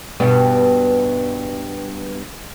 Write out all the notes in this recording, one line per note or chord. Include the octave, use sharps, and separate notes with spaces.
G2 B2 B3